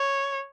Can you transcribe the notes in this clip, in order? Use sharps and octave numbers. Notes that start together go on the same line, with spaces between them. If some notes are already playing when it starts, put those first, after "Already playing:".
Already playing: C#5